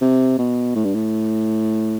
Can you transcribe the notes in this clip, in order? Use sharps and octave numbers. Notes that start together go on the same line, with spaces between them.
C3
B2
A2
G2
A2